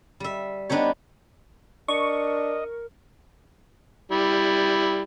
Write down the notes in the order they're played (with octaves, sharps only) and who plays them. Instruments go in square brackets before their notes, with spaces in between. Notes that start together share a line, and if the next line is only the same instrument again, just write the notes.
[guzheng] G3 E5
B3 D4 D#4 G4 C#5
[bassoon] D4 [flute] A#4 [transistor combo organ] D#5 [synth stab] C#6
[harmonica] G3 E4